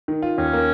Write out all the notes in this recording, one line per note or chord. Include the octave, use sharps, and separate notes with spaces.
D#3
F4
D#2 C#4
A#3